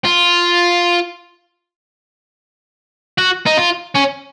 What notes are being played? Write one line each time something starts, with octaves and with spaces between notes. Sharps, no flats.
F4
F#4
D#4
F4
C#4